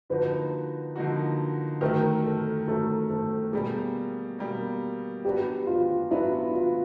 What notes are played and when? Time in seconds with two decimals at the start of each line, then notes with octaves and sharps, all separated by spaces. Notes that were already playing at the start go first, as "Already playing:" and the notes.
0.10 D3 F3 A#3 D#4 F#4 B4
0.96 D3 F3 A#3 D#4 F#4
1.81 D#3 F#3 A3 A#4
2.24 A4
2.67 D#3 F#3 A3 A4
3.10 A4
3.52 B2 G3 A#3 G#4
4.39 B2 G3 A#3
5.24 F#3 B3 D4 F#4 G4
5.67 F4
6.10 F#3 B3 D4 E4 F#4
6.53 F4